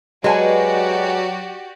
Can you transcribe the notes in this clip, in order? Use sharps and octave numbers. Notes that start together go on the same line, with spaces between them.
F#3 G#3 F#4 G4 B4 D5 G#5